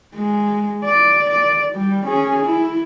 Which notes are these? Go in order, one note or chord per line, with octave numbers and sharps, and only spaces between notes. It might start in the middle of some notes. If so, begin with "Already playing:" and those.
G#3
D5
D5
G3
C#4 G#4
E4